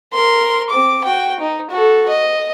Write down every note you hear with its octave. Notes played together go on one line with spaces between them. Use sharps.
A#4 C6
C4 D6
F#4 G5
D#4
F#4 A4
D#5